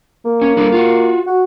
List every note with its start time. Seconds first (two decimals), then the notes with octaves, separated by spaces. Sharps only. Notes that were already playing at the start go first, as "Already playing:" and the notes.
0.25 A#3
0.42 C#4
0.57 G3 D4 A4
0.72 F4 F#4
1.27 F#4